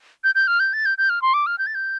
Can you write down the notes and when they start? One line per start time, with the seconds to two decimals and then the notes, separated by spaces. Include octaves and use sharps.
0.24 G6
0.35 G6
0.47 F6
0.60 G6
0.73 A6
0.85 G6
0.98 G6
1.09 F6
1.22 C6
1.34 D6
1.46 F6
1.58 G6
1.66 A6
1.75 G6